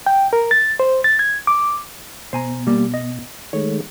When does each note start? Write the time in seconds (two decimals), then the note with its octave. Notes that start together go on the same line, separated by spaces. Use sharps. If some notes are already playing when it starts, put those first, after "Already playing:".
0.06 G5
0.33 A#4
0.51 A6
0.80 C5
1.04 A6
1.19 G#6
1.47 D6
2.33 B2 C5 G#5 A#5
2.67 G3 A#3
2.94 D#5
3.53 D#3 G#3 A3 C#5